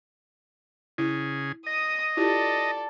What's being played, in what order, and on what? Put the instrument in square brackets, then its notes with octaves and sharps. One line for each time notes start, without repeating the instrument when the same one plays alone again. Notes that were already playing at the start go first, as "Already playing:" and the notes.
[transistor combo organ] C#3 G#4 [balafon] E4
[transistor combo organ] D#5 [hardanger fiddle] D#6
[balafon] E4 F4 G4 [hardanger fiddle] A4 D5